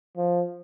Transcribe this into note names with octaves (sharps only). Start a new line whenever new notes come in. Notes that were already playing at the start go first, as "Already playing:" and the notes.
F3